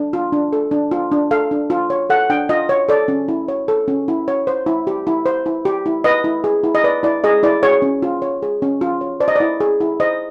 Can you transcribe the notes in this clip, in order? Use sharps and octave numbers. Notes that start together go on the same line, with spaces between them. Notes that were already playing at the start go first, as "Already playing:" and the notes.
Already playing: D4
F4
D4
A4
D4
F4
D4
A4 F5
D4
F4
C#5
A4 F#5
D4 G5
F4 D#5
C#5
A4 D5
C#4
E4
C#5
A4
C#4
E4
C#5
C5
E4
G4
E4
C5
E4
G4
E4
B4 D#5
E4
G#4
E4
D#5
B4 D5
E4 D5
G#4 D#5
E4 D5
G#4 C#5
C#4
F4
C#5
G#4
C#4
F4
C#5
C5 D5
D#5
E4 D5
G#4
E4
C5 D#5